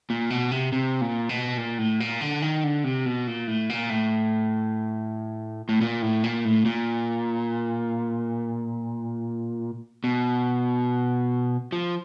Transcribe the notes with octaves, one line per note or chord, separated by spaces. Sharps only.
A#2
B2
C3
C3
A#2
B2
A#2
A2
A#2
D3
D#3
D3
C3
B2
A#2
A2
A#2
A2
A2
A#2
A2
A#2
A2
A#2
B2
F3